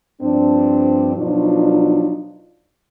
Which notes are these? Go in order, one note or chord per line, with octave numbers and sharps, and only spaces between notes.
G2 F3 C4 D4
B2 F3 F#3 D4 D#4 F4